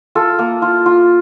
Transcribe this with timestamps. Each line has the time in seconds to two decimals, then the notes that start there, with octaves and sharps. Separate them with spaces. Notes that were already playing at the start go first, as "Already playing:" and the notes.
0.15 F4 A4
0.39 A#3
0.62 F4
0.86 F4